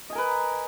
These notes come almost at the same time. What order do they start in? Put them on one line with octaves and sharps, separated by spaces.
D#5 G#5 A#4 B4